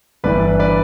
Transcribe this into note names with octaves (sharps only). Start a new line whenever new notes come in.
G1 G2 E3 B4 D5
B4 D5